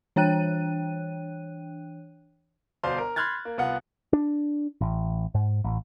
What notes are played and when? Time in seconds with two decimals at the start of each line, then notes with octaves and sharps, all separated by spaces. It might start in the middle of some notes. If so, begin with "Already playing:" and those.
0.16 E3 D4 C#5 G5 F#6 D#7
2.83 G1 B2 C5 D5 F5 C6
2.98 A#4
3.16 B5 C6 F6 F#6 G#6 A6
3.45 A#3
3.58 C2 B3 F4 F#5
4.13 D4
4.81 A1
5.34 G#2
5.64 A1